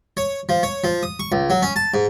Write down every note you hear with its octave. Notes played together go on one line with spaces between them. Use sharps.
C#5
F3
C#5
F3
D#6
C#6
C#2
F#3
C#4
A5
G#2